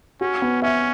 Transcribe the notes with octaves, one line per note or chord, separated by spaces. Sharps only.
C#4 F#4
B3
C#4 E5